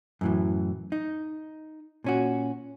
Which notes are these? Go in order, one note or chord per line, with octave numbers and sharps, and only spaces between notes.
F#2 A2 E3
D#4
A#2 C#4 F#4